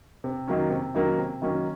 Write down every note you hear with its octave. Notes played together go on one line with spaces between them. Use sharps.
C3
D#3 F#3 A#3 C#4
C3
D#3 F#3 A#3 C#4
C3
D#3 F#3 A#3 C#4